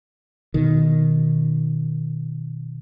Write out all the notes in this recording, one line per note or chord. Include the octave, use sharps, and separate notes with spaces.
B2 D#3